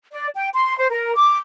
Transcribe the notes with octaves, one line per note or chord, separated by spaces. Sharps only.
D5
G5
C6
C5
A#4
D6